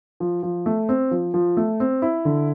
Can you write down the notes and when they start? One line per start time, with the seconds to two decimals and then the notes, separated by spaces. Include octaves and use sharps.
0.20 F3
0.43 F3
0.66 A3
0.89 C4
1.11 F3
1.34 F3
1.57 A3
1.80 C4
2.02 E4
2.25 D3